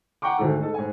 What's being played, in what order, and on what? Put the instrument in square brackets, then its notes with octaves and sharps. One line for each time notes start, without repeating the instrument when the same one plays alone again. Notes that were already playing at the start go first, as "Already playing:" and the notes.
[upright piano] F#5 G5 A#5 C#6 D6
D2 G#2 D#3 A4
G#3 D#4 A4
G#2 G#5